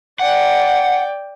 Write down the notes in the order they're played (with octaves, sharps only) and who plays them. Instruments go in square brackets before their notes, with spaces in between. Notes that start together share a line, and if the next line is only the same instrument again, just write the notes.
[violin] D5 G5 [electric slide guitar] F#5